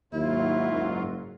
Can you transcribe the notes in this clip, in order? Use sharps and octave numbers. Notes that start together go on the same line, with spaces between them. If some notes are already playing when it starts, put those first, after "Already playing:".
D#2 G#2 F#3 E4 F4
F#1